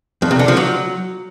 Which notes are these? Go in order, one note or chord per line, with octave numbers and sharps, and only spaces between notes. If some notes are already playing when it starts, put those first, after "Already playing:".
F2
C3
D3
F3
F#3